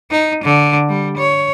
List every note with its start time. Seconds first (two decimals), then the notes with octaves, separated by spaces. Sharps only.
0.11 D#4
0.44 D3
0.88 G3
1.17 C#5